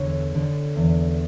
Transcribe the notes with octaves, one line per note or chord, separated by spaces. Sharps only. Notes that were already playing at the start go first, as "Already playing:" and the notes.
Already playing: E2 D3 C#5
D3
E2